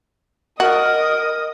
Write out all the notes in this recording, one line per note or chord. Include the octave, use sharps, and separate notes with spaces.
F#4 A#4 D#5 D#6